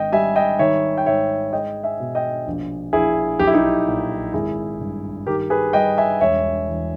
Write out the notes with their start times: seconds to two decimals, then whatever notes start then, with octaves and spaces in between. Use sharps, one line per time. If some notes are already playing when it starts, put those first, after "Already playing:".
Already playing: G#1 D#5 G5
0.13 G3 E5 G#5
0.36 D#5 G5
0.59 D#3 C#5 E5
0.98 G5
1.06 G#2 C#5 E5
1.53 G#3 D#5 G5
1.84 E5 G#5
2.00 B2
2.15 D#5 G5
2.47 A#1
2.93 A#1 E4 G#4
3.39 B1 G4
3.47 E4
3.54 D#4 G4
3.87 A#2
4.33 G#1 E4 G#4
4.80 G2
5.27 D#3 G4 A#4
5.50 G#4 B4
5.73 G3 D#5 G5
5.98 E5 G#5
6.21 E1 C#5 E5
6.68 E2